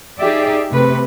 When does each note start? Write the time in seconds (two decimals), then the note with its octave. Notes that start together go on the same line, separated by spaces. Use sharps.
0.20 D#4 G4 G#4 D5 E5
0.70 C3 A3 B4